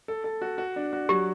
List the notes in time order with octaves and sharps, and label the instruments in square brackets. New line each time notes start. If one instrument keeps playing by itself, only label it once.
[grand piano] A4
A4
F#4
F#4
D4
F#4
[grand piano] F#3 [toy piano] G4